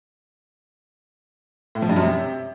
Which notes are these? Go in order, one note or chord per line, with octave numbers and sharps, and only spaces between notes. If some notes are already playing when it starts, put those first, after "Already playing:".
A2
F3
G2
F#2
C3